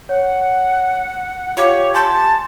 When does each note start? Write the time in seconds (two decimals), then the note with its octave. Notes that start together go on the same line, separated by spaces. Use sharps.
0.09 C#5 F#5
1.57 F4 G4 C#5 F5 D6
1.94 G#5 A5 C6 G6